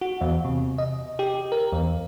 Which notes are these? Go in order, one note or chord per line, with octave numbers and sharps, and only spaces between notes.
F#4
E2
C3
D#5
G4
A#4
E2